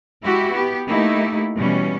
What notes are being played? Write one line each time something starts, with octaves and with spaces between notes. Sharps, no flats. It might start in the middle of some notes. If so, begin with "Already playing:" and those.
G#3 E4 F#4 G4
B3 G4
A3 A#3 D#4 E4 G4
B2 E3 G3 C#4